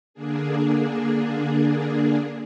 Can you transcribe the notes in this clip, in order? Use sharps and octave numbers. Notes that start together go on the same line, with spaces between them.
D3 A#3 D4 G#4